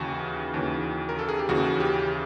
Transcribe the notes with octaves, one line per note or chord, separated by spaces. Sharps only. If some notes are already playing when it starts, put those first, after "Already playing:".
Already playing: D#2 C#3 E3 F#4
D#2 C#3 E3
A#4
A4
G#4
G4
D#2 C#3 E3 F#4
G4